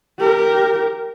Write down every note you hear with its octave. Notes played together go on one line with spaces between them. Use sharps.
G4 A#4